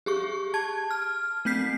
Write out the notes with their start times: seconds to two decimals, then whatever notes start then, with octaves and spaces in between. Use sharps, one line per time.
0.06 G4 G#4 C#6
0.54 A5 G#6
0.91 F6
1.45 A3 C4 G6 B6 C7